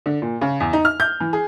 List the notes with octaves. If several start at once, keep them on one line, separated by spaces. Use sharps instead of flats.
D3
A#2
C#3
E2
D#4
F6
G6
E3
G#4